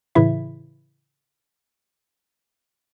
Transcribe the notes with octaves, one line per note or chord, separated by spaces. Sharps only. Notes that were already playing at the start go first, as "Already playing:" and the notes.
A2 C#3 E3 E4 E5